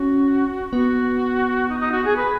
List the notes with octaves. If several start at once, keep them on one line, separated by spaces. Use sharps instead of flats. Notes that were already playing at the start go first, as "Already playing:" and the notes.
Already playing: C#4 F#4
B3 F#4
D#4
D#4
F#4
G#4
B4